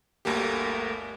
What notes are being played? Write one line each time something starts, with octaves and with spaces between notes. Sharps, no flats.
G1 D2 A3 A#3 G4